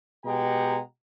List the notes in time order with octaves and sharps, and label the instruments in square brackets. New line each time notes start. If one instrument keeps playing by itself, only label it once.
[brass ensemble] B2 G#3 G4 F#5 G5 A#5